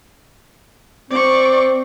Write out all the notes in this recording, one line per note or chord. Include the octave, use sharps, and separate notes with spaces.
C4 D5 C#6